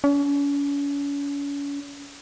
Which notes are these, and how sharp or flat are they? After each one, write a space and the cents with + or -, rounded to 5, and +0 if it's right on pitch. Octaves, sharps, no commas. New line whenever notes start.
C#4 +40